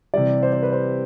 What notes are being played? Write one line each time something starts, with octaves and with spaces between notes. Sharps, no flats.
C3 E3 G3 D5
C5
C5
B4
C5